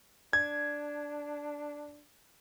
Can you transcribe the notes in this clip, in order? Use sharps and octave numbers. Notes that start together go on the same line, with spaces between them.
D4 G#6